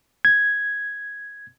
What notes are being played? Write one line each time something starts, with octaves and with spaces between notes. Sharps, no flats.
G#6